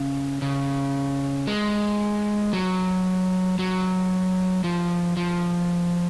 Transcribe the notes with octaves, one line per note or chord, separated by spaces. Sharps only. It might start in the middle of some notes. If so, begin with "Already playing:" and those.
Already playing: C#3
C#3
G#3
F#3
F#3
F3
F3